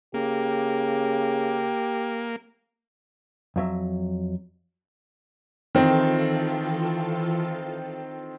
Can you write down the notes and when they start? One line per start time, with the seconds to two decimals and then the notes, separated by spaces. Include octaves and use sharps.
0.14 C#3 A#3 G4
3.56 F2 F#3 E5
5.75 D#3 E3 C4 D#4 F4 A4